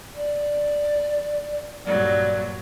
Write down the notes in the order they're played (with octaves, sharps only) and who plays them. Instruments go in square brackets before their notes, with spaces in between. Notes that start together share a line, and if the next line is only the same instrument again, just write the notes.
[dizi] D5
[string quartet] G2 A#2 F#3 [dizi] D5